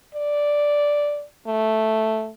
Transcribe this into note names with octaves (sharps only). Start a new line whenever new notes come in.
D5
A3